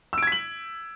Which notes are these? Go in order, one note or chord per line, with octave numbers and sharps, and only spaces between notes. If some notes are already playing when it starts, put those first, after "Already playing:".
E6 G#6 B6 D7 F#7